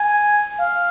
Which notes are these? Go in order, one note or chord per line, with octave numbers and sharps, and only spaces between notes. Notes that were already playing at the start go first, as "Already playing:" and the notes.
Already playing: G#5
F5